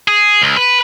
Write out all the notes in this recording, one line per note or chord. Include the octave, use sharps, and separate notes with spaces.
G#4
C#2
B4